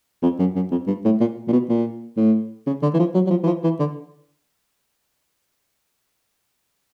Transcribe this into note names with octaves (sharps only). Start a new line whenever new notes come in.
F2
F#2
F#2
F2
G2
A2
A#2
A#2
B2
A#2
A2
C#3
D3
E3
F3
F#3
F#3
F3
E3
F3
E3
D3